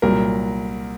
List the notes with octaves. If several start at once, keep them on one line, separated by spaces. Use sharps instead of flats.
C2 A#2 F#3 A#4